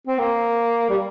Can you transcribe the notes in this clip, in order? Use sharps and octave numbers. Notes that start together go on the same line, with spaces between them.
C4
A#3
G3